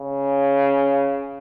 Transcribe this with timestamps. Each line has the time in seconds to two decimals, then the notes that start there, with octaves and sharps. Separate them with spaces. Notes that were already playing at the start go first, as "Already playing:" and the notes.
Already playing: C#3